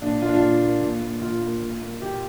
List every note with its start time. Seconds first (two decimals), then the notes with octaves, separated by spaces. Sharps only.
0.02 A#2 D4
0.22 A#3 F4
0.29 D4
0.36 F4
0.41 A#2
0.62 A#3
0.81 A#2
1.02 A#3
1.21 A#2 F4
1.42 A#3
1.61 A#2
1.82 A#3
2.02 A#2 G4